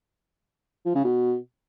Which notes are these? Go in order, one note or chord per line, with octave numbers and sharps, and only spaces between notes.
F3
C#3
B2